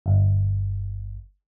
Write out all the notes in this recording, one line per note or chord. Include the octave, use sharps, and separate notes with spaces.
G1